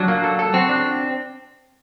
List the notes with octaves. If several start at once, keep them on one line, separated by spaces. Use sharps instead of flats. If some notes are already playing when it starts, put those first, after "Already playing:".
Already playing: F#3 D4
A#3
A4
A4
C4 F#4
D4